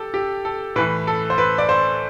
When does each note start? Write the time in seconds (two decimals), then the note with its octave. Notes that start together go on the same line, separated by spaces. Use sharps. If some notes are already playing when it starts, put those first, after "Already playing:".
Already playing: G4 A4
0.14 G4
0.45 A4
0.76 A2 E3 B4
1.07 A4
1.30 C5
1.38 B4
1.58 D5
1.69 C5